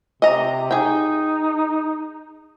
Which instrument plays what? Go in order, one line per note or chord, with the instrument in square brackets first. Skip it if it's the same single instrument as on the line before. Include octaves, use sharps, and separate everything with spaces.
[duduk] C3 [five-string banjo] D#5 A#5
[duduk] D#4 [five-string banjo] G#4 G5